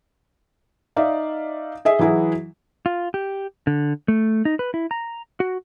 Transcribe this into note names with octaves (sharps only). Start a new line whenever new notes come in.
D#4 D5 E5 F5
G#4 D#5 E5
E3 F#3 E4 F#4 G#4
F4
G4
D3
A3
D#4
B4
E4
A#5
F#4